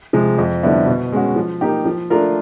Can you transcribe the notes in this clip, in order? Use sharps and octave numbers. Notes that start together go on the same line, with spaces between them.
C3 F3 G#3
F2
D3 G3 B3 E4
B2
G#3 C#4 F#4
F3
A#3 D#4 G4
F3
A3 D4 F4 A#4